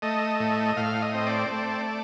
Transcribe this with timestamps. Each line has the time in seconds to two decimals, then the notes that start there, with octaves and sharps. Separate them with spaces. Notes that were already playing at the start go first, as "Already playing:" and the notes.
0.02 A3 D#5
0.40 A2
0.77 A2 F5
1.02 D#5
1.14 C4
1.27 D5
1.51 A3